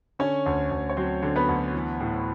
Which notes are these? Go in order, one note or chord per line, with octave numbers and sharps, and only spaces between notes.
D3 C#4 C#5
D2
D2
C#5
F#3 C4 C5
D3
B3 B4
D2
E3
A2